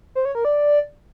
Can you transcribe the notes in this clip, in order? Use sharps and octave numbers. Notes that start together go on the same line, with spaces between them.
C5
C#5
A#4
D5